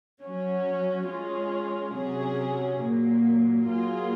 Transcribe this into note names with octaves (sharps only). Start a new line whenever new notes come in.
F#3 C#4 F#4
G#3 C#4 F4 G#4
C3 F#3 C#4 G#4
A#2 F#3 A#3
F#3 A#3 F4 G#4